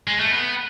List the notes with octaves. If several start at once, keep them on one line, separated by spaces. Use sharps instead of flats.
G#3
A3
B3